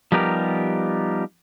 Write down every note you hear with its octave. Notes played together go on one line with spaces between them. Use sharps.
F3 G3 B3 D#4 G4 A#4